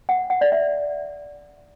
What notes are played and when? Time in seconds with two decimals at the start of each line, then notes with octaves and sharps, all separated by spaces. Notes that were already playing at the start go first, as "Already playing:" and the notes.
0.09 F#5
0.30 F#5
0.41 D5
0.52 E5